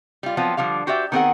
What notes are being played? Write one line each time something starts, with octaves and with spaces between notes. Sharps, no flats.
G3 F4
F3 F#3 B3 C4 F4
D3 F3 G3 F5
F#4 G4 C5 D5 E5
D#3 B3 C4 G#4 A#4 F#5